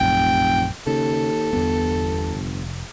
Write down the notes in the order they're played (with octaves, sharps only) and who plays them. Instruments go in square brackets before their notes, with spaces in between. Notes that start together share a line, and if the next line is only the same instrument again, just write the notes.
[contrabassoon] F1 [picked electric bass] A#1 F#2 [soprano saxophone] G5
[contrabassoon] D#2 [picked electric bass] C#3 [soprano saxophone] A4
[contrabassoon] G1 [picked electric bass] E2 B3
[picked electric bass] F1